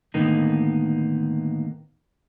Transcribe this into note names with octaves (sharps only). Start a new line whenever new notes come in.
A2 D3 D#3 A#3 B3 D#4